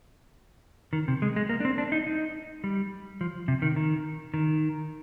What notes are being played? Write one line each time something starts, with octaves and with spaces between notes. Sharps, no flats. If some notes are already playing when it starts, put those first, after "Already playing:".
D#3
C3
G#3
G#3
A#3
D4
C4
D4
D#4
D#4
G3
F3
C3
D#3
D#3
D#3